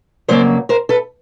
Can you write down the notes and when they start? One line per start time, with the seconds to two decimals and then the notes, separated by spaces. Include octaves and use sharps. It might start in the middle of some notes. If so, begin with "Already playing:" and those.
0.28 F2 C#3 F#3 A#3 C5 D5
0.69 A#4 C5
0.89 A4 B4